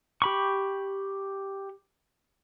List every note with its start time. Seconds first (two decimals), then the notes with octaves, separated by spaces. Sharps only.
0.22 G4 B5 C#6